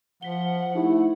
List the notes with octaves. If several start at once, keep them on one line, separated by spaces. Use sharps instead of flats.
F3 F#5 B6 G7
A3 D#4 E4 G4 C5